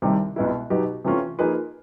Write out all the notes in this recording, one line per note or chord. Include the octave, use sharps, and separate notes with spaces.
C2 C3 D#3 G3
C2 B2 G#3 B3 E4
B2 F#3 B3 D#4 G4
C3 E3 A3 C#4 F4
F3 A#3 D#4 G#4 B4